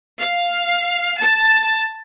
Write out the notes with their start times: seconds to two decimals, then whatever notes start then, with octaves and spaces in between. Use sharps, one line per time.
0.20 F5
1.19 A5